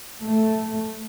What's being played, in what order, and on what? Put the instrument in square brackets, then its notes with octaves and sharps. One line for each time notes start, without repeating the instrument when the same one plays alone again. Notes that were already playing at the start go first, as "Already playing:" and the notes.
[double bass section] A3